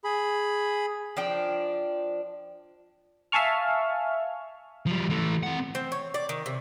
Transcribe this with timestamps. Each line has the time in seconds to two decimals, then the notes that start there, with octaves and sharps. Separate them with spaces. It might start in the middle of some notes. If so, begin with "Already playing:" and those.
0.04 G#4 B5
1.17 F3 D4 G5
3.32 E5 F5 G#5 A5 C#6 F6
4.86 F3 G3
5.10 E3 A3
5.43 C4 F#5
5.75 C4
5.92 C#5
6.14 D5
6.29 D#3
6.46 C3